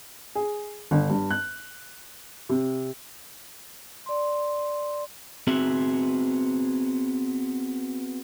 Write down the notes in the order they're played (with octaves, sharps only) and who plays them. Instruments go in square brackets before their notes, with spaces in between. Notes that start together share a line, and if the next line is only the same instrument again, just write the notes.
[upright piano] G#4
G1
G2
F#6
C3
[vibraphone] D5 C6
[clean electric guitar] B3 C4 F#4 G#4 E5